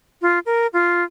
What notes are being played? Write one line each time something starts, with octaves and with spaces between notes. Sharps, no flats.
F4
A#4
F4